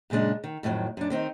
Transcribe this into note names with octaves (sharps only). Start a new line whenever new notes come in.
F#2 A#2 C#3 G#3 D4
D#3
F2 A2 D#3 F3 F#3
F#2 D4
D#3 C4 D#4